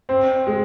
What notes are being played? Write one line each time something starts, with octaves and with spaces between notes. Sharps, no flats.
C4
G#3